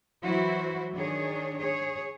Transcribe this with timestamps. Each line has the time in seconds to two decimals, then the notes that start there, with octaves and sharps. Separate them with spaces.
0.23 E3 F#3 E4 F#4 C5
0.95 D#3 D4 G#4 C#5
1.58 G#4 C#5